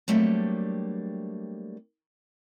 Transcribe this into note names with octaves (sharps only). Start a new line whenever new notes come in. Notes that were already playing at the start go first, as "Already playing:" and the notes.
F#3 G3 A3 A#3 C4 D4